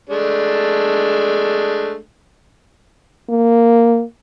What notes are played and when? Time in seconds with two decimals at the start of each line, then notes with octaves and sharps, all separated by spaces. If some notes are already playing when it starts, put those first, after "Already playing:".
0.09 G#3 A3 D4
3.30 A#3